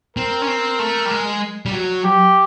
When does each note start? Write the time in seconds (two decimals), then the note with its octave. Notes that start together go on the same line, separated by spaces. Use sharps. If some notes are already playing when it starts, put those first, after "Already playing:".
0.16 C4 A#4
0.42 C#4
0.48 C4
0.79 A3
1.05 G3
1.11 G#3
1.66 G3
1.72 F#3
2.04 G4